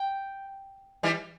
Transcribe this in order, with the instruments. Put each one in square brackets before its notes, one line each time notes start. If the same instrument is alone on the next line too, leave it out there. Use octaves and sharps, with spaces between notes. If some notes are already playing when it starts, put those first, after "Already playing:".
Already playing: [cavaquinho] G5
[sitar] E3 G3